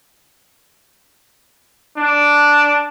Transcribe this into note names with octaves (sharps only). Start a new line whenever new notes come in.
D4